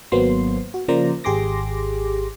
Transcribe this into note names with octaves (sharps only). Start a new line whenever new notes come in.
G#1 F#3 A#3 B3 C5 C6
F#4
C#3 F3 A#3 C5 D5 A#5
G#1 G4 G#4 C6 D6 A#6